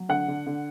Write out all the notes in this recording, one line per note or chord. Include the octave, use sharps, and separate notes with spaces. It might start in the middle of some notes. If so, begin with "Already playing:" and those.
Already playing: F#3
D3 F#5
D3
D3